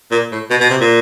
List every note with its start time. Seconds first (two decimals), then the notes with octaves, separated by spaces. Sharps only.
0.11 A#2
0.32 A2
0.50 B2
0.61 B2
0.70 C3
0.81 A#2